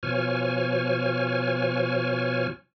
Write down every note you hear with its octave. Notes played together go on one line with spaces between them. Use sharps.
B2 F3 C#5 G#5 F6